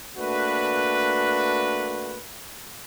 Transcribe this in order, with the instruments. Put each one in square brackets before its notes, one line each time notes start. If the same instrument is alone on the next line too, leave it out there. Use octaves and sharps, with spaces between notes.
[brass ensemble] A3 A#3 D4 F#4 B4